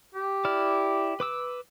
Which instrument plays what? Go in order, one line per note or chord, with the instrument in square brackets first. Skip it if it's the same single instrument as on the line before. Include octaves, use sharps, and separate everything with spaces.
[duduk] G4
[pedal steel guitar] E4 D5 F6
B4 D6 E6